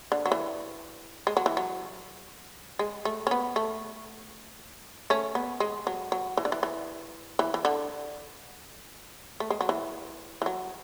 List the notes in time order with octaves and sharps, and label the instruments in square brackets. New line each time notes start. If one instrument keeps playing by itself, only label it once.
[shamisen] D3
F#3
E3
G#3
F#3
E3
F#3
G#3
A3
C#4
B3
A3
A3 C#4
B3
G#3
F#3
F#3
E3
D3
E3
E3
E3
E3
D3
A3
G#3
F#3
E3
E3
F#3